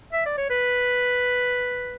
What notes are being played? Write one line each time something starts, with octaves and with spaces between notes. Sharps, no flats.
E5
D5
C#5
B4